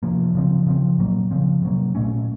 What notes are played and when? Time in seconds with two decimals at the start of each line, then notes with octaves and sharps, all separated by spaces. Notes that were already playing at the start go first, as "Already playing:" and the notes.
0.03 C3 F3 A#3
0.35 C#3 F3 C4
0.67 C#3 F3 C4
0.99 A#2 F#3 A#3
1.31 C#3 F3 C4
1.62 C3 F#3 A#3
1.95 A#2 A3 C#4